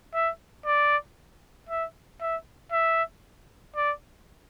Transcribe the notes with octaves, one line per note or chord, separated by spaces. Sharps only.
E5
D5
E5
E5
E5
D5